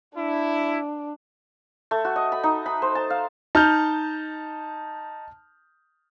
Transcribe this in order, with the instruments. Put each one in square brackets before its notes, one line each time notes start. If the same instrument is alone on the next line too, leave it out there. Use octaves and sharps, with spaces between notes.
[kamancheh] D4 [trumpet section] E4
[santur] A3
F#4
D#5
B5
D#4
B5
C5
A5
F5
[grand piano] D#4 [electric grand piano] A5 F6 G6